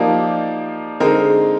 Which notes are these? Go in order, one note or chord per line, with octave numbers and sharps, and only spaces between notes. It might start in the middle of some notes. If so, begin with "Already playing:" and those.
Already playing: F3 A#3 D#4 G4 D5
D3 G#3 C4 D#4 A#4